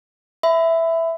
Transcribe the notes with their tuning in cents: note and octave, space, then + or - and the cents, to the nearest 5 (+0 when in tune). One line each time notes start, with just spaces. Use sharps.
E5 +0 B5 +25